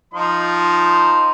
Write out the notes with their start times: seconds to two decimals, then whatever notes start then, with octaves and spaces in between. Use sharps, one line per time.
0.14 F3 D#4 C6